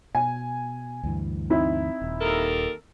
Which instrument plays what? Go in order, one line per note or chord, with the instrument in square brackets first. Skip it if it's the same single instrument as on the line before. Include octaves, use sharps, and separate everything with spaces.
[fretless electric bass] B2 [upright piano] G#5
[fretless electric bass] D2 G2 E3
[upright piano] C4 D#4 E4
[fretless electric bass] D#1
[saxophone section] D#2 A4 A#4